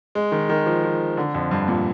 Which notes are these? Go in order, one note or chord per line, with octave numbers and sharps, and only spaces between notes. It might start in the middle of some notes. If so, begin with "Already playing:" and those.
G#3
D#3
D#3
F3
F3
D3
F2
G2
A#2